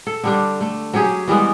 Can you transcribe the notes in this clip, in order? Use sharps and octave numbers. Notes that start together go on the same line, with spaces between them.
A4
D3 G3 D4
A3
F#3 C#4 G4 G#4
E3 G3 G#3 B3